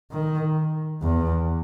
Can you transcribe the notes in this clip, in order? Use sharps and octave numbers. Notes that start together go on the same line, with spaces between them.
D#3
E2